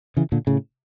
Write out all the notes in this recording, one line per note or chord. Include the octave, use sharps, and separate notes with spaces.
C#3 E3
A#2 D3
A2 C#3